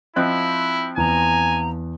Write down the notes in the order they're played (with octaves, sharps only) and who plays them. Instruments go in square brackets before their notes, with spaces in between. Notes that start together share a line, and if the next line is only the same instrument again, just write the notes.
[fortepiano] F3 C4 D#5 [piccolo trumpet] E4 [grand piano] F#6
[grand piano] E2 [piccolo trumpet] G#5 [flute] A#5